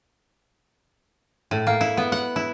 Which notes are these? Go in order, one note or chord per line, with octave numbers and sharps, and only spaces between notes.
A2
A#3
E4
B3
F#5
E4